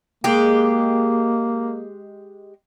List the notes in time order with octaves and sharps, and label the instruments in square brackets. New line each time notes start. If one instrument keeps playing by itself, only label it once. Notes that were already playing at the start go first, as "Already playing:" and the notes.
[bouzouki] G#3 G4 [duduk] A#3